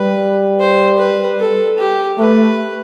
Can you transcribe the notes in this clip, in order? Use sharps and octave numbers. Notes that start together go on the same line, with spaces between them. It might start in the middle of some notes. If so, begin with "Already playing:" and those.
Already playing: G3 B4
C5
B4
A4
G4
A3 B4